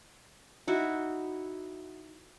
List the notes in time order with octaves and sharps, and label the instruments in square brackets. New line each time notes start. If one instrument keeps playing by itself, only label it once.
[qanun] D#4 E4 F#4